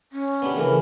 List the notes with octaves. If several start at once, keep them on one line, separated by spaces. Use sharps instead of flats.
C#4
B3 D4 G4
C#3 E3 A3 A#4